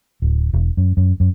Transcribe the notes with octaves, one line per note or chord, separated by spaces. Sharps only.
D1
E1
F#2
F#2
F#2